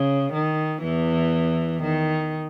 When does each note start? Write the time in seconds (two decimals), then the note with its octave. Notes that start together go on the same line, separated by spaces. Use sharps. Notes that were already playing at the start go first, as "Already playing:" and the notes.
Already playing: C#3
0.33 D#3
0.83 E2 E3
1.82 D#3